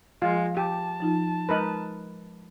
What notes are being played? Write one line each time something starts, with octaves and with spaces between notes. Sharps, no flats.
F3 G#3 F4
G4 A5
F3 D#4 F4
G#3 D#4 A#4 B4 D#5